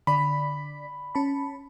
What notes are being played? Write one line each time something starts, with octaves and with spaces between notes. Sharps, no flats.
D3 D5 B5 B6
C#4 A5 B5